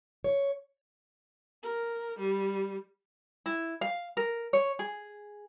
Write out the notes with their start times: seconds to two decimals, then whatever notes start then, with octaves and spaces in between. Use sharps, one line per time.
0.24 C#5
1.63 A#4
2.19 G3
3.46 E4
3.81 F5
4.17 A#4
4.53 C#5
4.79 G#4